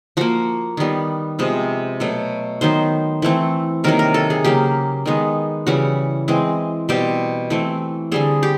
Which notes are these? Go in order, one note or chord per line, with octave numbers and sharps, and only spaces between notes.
F3 A#3 F#4
D#3 G3 B3
C3 F3 G#3 B3
B2 F#3 A3
D#3 F#3 B3 C5
E3 A3 C4
C3 D#3 F#3 A#3 A#4
A#4
A4
G#4
C#3 F#3 A#3 G4
D#3 G#3 B3
C#3 E3 G3 F#4
E3 G#3 C4
B2 G3 C4 G4
E3 A3 C4
D3 G3 C4 G#4
G4